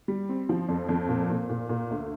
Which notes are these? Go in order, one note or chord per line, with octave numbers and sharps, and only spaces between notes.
G3
C4
F3
F2
F2
A#2
A#2
A#2
A#2
D2